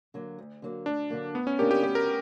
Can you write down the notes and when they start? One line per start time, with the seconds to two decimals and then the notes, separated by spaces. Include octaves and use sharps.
0.14 D3 F#3 A#3
0.38 D2
0.62 D3 F#3 A#3
0.86 D2 D4
1.10 D3 F#3 A#3
1.35 D2 B3
1.47 C#4
1.59 D3 A#3 D4 G4 A#4
1.71 G4
1.83 D2 G4
1.95 A#4